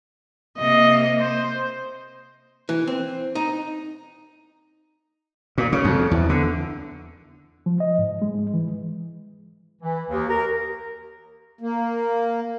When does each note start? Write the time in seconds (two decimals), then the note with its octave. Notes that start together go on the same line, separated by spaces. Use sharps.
0.58 C3 A#3 D#5
1.21 C5
2.69 E3
2.87 C4
3.35 D#4
5.58 A#2
5.72 C#3
5.85 F2
6.11 E2
6.29 D3
7.66 F3
7.80 D#5
7.98 G#2
8.22 G#3
8.54 E3
9.81 E3
10.10 D#2
10.29 A#4
11.61 A#3